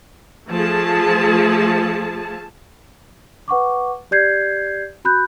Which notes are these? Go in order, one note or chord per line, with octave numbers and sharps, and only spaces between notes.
F3 A3 G#4 A5
B4 F#5 C#6 D6
G4 D5 G6 G#6 C7
F#4 B5 F#6 G6